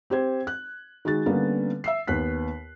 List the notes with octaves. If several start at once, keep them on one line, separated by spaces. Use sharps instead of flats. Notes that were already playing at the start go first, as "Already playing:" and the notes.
C4 G4 C5 G#6
F#6
D#3 G#3 F#4 A6
D3 G3 A#3 B3 C#4
E5 E6 C7
D#2 B3 F#6 B6